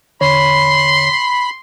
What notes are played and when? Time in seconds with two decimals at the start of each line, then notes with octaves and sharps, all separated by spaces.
0.21 E2 D3 C#5 B5 C6